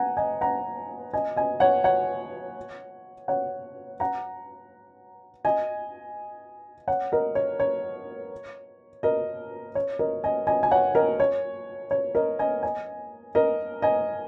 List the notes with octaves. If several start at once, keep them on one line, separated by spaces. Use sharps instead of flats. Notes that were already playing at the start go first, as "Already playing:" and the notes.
Already playing: F#5 G#5 A#5
D#5 G#5
F#5 A#5
D#5 G#5
D#5 G#5
C#5 F#5
C#5 F#5
C#5 F#5
F#5 A#5
D#5 G#5
C#5 F#5
A#4 D#5
C#5
C#5
A#4 D#5
C#5
A#4 D#5
D#5 G#5
D#5 G#5
G#5
C#5 F#5
A#4 D#5
C#5
C#5
A#4 D#5
D#5 G#5
D#5 G#5
A#4 D#5
D#5 G#5